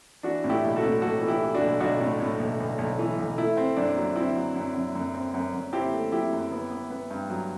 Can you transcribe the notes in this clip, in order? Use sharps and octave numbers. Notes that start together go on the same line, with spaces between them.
E3 D4 F#4
A2
E4 G4
B1
F#4 A4
A2
B1 F#4 A4
E3
E4 G4
E3
D4 F#4
B1
B1 D4 F#4
A2
A2
B1
B1
B1
E3
B1
A3 E4
C4
F#2 D4
F#3
C4 E4
F#3
F#2
F#2
F#2
C4
F#2
F#2
C4 E4 G4
A3
F#3 E4 G4
F#2
B3
B3
B3
G2
F#3